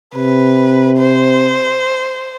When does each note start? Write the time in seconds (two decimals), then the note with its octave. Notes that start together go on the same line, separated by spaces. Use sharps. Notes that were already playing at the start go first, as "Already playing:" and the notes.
0.15 C3 B4
0.99 C5